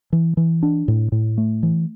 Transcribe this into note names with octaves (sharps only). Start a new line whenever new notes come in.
E3
E3
D4
A2
A2
A3
E3